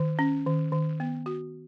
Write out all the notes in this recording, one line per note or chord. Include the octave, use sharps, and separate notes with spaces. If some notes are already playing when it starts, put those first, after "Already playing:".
Already playing: D#3
C#4
D#3
D#3
B3
F#4